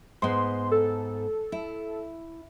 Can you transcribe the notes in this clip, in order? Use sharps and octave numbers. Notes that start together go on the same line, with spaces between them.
G#2 B3 C6
A4
E4